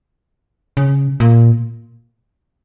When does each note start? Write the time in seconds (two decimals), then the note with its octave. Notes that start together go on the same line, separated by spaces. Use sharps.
0.77 C#3
1.20 A#2